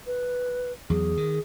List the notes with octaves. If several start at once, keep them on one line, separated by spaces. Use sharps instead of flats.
B4
E2 F#3 G#4
D#3